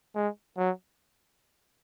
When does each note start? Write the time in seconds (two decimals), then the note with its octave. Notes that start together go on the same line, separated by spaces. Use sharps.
0.15 G#3
0.58 F#3